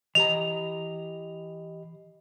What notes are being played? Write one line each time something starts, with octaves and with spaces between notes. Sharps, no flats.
E3 G4 D#5 A#5 F7